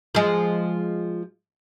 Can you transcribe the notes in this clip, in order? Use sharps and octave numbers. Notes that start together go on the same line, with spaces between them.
F3 G#3